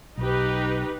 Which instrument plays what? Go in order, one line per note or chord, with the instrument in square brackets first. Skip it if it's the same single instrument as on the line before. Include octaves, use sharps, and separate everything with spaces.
[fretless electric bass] B1 [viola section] D#4 G4 B4